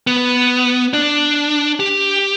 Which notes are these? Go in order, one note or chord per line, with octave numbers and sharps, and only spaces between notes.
B3
D4
G4